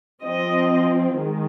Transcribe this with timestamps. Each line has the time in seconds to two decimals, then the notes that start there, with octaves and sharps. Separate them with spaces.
0.22 F3 C4 D#5
1.16 D#3 G#3